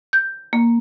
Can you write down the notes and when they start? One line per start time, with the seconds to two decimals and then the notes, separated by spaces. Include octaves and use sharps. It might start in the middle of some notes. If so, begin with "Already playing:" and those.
0.13 G6
0.53 A#3